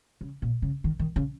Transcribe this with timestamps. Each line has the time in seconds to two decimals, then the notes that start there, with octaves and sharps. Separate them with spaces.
0.21 C#3
0.42 A#2
0.62 C#3
0.84 D#3
0.99 D#3
1.16 C#3